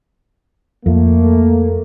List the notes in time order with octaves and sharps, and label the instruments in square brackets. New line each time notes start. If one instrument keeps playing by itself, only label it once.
[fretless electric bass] F2 [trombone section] A3 A#3